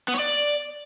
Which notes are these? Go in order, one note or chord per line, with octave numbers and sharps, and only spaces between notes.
B3
C#5
D5